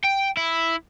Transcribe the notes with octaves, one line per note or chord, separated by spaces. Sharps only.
G5
E4